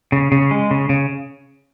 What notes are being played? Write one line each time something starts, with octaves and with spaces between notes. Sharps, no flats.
C#3
C#3
G#3
C#3
C#3